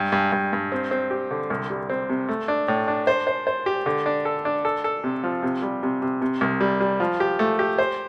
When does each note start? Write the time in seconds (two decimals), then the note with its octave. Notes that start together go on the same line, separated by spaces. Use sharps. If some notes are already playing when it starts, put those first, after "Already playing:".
Already playing: G2
0.12 G2
0.32 G2
0.53 G2
0.72 C4
0.91 C4
1.11 G4
1.31 D3
1.50 C2
1.70 G3
1.89 C4
2.09 C3
2.29 A3
2.48 D4
2.68 A2
2.88 D4
3.07 C5
3.27 C5
3.47 C5
3.66 G4
3.86 D3
4.06 D4
4.25 A4
4.45 D4
4.65 A4
4.84 A4
5.04 C3
5.23 F3
5.43 C3
5.62 G3
5.83 C3
6.02 C3
6.22 C3
6.41 C2
6.61 G3
6.80 G3
7.00 F3
7.20 G4
7.39 A3
7.59 G4
7.78 C5